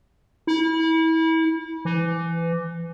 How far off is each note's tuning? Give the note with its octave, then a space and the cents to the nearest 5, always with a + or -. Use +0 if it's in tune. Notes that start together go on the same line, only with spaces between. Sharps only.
E4 -30
E3 +25